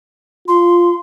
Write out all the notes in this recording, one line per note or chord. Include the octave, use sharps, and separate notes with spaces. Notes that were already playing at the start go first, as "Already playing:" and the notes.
F4 C6